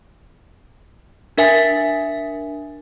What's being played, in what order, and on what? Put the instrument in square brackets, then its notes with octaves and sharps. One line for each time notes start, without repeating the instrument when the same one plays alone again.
[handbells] D4 A#4 E5 G#5 A6 B6